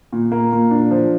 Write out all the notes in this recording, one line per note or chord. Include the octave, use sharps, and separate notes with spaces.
A#2
A#3
A#2
D4
F3